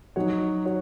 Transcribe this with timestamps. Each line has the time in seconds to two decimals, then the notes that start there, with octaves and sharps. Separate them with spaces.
0.16 F#3 D#4 F#4 C#5
0.65 F#4 C#5